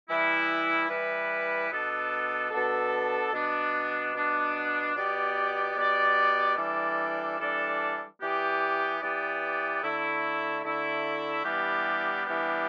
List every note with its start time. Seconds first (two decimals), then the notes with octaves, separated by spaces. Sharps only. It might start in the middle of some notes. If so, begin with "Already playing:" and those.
0.07 E3 G3 E4 B4
0.88 E3 G3 E4 B4
1.69 B2 B3 D4 A4
2.50 B2 B3 D4 A4
3.32 B2 B3 D4
4.13 B2 B3 D4
4.94 B2 B3 G4 D5
5.75 B2 B3 G4 D5
6.57 E3 G3 D4 A4 D5
7.38 E3 G3 D4 A4 D5
8.19 E3 B3 G4 D5
9.00 E3 B3 G4 D5
9.81 D3 A3 E4
10.63 D3 A3 E4
11.43 E3 G3 B3 D4 G4
12.25 E3 G3 B3 D4 G4